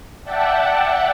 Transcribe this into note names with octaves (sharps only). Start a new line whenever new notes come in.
D5 E5 F#5 G5 A5